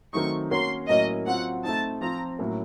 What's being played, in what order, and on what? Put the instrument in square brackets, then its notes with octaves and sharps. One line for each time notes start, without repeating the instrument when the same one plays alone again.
[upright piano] D#3 F#3 A3 C4 D#4 [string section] C#6
[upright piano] A#3 C#4 F#4 A#4 C#5 [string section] C6
[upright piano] A2 F#3 A#3 C#4 [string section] D#5
[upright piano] F#3 C4 F4 [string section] F#5
[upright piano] A3 C4 D#4 [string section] A5
[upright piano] F3 C4 F4 [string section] A#5
[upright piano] A2 F#3 A#3 C#4